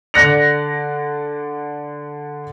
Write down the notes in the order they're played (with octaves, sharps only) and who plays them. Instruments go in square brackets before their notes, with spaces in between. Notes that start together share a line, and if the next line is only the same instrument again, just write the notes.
[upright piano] D3 D5 F#6 A#6 C#7 F7